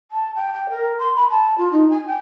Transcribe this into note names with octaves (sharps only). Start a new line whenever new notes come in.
A5
G5
G5
A#4
C6
B5
A5
F4
D#4
G#5
G5